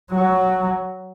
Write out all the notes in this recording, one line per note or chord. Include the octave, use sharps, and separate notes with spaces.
F#3